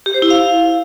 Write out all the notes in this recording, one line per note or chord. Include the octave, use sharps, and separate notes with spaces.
G4
C5
E4
F5